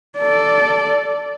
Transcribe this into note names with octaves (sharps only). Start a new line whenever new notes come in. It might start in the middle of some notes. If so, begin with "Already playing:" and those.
A4 D5